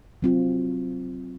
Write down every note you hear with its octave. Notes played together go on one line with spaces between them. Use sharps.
F#3 C4 F4